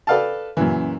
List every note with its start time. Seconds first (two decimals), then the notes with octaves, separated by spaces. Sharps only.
0.07 A4 B4 D5 F5 G5 A5
0.57 F#2 A#2 C#3 E3